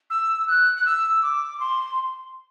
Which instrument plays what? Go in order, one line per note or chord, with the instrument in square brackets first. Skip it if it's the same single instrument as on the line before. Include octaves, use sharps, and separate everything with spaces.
[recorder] E6
F#6
F#6
E6
D6
C6